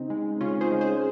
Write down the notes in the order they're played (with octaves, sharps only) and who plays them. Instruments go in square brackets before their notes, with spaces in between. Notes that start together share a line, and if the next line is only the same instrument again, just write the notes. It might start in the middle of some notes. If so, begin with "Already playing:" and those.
Already playing: [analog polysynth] C#3 C4 D#4
G#3
C#3 C#4 F4
G#4 C5
G#3
G#4 C5